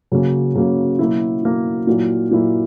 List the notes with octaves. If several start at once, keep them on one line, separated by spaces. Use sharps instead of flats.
C#3 F#3 A#3 C#4
C#3 F#3 A#3 C#4
B2 F#3 A#3 E4
B2 F#3 A#3 E4
A#2 F#3 A#3 E4
A#2 F#3 A#3 E4